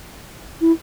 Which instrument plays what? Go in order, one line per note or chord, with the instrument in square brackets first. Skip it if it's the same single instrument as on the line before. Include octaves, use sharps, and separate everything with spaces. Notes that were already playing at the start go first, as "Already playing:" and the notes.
[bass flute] E4